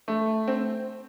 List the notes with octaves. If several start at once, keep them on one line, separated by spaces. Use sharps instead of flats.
A3
C4